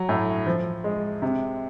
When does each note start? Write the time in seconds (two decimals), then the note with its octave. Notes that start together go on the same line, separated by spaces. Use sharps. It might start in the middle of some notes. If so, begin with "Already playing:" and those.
Already playing: F#3
0.09 A2
0.46 F3
0.84 G#3
1.22 C3